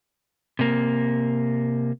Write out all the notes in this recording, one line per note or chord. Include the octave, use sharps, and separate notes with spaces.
C3 A#3